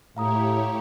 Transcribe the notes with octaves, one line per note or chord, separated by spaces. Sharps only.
A2 E4 G4 C#5 F5 A#5 D#6